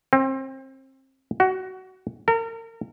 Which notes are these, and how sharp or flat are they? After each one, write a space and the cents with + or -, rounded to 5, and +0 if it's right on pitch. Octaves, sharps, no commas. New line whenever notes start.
C4 +30
F#4 +20
A#4 -35